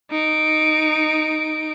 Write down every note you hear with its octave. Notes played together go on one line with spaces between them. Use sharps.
D#4 D7